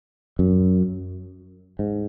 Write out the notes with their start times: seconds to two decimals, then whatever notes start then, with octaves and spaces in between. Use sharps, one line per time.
0.39 F#2
1.79 G#2